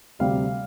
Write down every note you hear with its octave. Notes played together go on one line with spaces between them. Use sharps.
D2 C3 G3 C4 F5